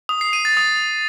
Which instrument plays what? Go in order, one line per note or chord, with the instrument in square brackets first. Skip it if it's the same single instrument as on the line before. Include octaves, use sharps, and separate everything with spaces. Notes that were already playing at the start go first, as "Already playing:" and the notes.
[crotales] D#6
C7
D#7
A6
D#6